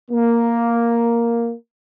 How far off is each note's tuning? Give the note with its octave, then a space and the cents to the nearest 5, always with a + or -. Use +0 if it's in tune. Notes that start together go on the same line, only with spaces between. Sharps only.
A#3 +0